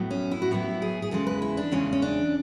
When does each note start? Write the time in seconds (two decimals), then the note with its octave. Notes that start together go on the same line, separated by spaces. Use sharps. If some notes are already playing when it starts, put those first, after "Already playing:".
Already playing: A2 F#3 B3
0.11 C#4
0.31 E4
0.42 F#4
0.51 A2 F#3 B3 E4
0.82 G#4
1.02 G#4
1.11 E2 C#3 G#3 A4
1.27 B4
1.42 E4
1.57 D4
1.72 E2 C#3 G#3 C#4
1.93 C#4
2.02 D4